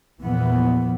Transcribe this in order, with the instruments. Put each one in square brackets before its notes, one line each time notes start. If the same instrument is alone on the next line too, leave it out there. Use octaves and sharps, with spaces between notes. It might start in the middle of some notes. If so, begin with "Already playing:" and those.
[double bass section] E2 A#2 E3 F3 B3